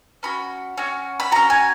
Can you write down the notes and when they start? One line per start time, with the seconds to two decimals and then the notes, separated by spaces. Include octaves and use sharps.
0.23 C#4 F#4 B5
0.77 C#4 F#4
1.20 B5
1.31 C#4 F#4 A#5
1.50 G#5